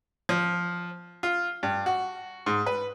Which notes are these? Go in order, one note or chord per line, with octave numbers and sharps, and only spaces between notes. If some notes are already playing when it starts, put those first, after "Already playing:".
F3
F4
G2
F#4
G#2
B4